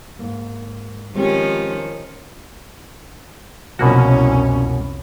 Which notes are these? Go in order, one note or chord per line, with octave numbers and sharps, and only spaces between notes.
G#2 A#3
D#3 F3 G#3 C4 C#4 G4
C2 F2 B2 A#3 C#4 F#4